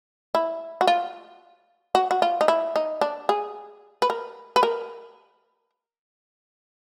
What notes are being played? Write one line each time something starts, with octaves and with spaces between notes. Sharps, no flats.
E4
F#4
F4
F#4
F#4
F4
D#4
E4
D#4
D4
G#4
B4
A#4
B4
A#4